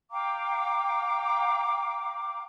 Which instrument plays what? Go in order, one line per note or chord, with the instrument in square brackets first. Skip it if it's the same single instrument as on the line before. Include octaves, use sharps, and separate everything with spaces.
[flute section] F5 G5 A#5 D6